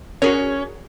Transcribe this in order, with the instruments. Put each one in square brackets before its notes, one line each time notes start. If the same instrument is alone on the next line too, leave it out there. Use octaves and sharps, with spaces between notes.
[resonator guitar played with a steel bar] C#4 [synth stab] F#4 G#4 C#5 [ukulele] A#4